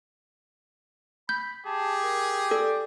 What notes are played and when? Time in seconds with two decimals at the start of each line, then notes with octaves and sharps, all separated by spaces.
1.29 B5 G6
1.66 G4 G#4 A5
2.04 A#4
2.51 A4 D5